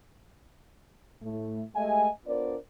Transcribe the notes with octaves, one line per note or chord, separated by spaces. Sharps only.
A2 A3
G#3 A3 G4 D#5 E5 G#5
B3 D4 F4 A#4 C5 D5